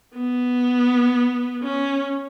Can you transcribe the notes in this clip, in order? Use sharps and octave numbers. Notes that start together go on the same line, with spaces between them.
B3
C#4